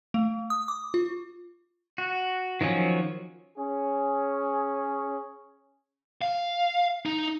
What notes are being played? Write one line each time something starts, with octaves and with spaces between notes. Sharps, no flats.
A3
D#6
D6
F4
F#4
D#3 F3 F#3 C#4
C#4 G#4
F5
D#4